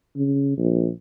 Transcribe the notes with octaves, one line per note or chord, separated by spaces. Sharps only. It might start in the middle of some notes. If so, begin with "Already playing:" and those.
C#3
A#1